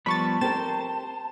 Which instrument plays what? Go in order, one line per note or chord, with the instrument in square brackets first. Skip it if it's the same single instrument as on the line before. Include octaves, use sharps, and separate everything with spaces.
[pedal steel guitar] F3 G3 B3 [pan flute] A5 [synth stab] B5 C#6 A6
[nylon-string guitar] C4 G4 A#4 [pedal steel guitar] C5 [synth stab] A6 E7